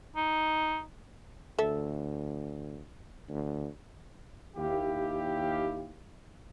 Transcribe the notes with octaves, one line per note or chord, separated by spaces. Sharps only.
D#4
D2 A4 E5
D2
D#2 E4 G4 F5